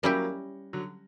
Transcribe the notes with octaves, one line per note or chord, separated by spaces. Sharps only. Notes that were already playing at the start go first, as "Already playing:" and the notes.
F#3 G3 A#3 C#4 E4 G4
D3 F#3